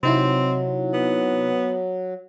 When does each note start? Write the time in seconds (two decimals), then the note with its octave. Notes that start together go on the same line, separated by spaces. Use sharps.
0.03 C3 F#3 C4 D#4 E4
0.94 B3